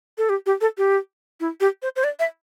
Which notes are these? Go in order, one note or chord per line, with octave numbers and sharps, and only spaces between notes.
A4
G4
G4
A4
G4
E4
G4
C5
C5
D5
E5